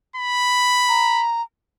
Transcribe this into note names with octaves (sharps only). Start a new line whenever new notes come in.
B5
A#5